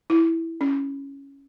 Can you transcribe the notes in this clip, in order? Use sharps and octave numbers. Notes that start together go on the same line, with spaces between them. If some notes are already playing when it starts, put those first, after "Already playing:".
E4
C#4